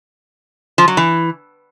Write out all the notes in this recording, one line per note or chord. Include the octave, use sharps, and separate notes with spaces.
F3
F#3
E3